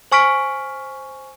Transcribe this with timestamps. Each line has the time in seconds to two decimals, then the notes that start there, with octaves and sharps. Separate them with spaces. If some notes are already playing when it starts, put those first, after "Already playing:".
0.12 C5 G#5 C#6 F6 B6 D7